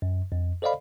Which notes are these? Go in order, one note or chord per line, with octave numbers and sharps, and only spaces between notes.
F#2
F2
A4 C5 D5 D#5 F5 B5